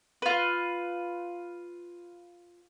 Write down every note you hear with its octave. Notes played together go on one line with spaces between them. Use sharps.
F4 B4